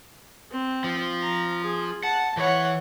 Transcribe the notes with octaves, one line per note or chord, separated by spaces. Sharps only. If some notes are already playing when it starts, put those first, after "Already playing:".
C4
F3
A#5
G#4
F#5 A5
E3 C#5 F#5